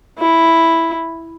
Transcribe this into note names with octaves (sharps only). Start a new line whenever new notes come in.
E4